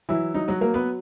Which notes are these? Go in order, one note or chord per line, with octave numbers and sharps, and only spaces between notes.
E3 F#3 E4
F#3 D#4
F#3 F#4
F#3 A#3 A#4
B3 B4